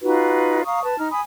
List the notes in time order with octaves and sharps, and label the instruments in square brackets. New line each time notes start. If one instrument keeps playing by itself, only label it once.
[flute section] D#4 F4 F#4 B4
F5 A#5 C#6 D#6
B4 A5
D#4 F6
G#5 B5 D#6